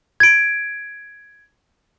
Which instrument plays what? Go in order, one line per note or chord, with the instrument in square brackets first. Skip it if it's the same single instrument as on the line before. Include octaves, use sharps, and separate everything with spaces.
[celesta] G#6 D7